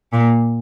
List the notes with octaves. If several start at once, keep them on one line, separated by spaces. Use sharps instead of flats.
A#2